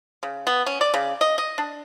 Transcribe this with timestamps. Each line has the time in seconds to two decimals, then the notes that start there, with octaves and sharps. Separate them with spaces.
0.23 C#3
0.47 B3
0.66 C#4
0.81 D5
0.94 C#3
1.21 D#5
1.38 D#5
1.58 D4